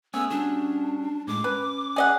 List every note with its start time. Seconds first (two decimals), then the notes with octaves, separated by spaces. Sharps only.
0.14 A3 B3 C#4 G#4 E6
0.30 G3 C#4 D4 F#4
1.27 A2 G#3 D6
1.44 C#4 B4
1.96 G#4 D#5 F#5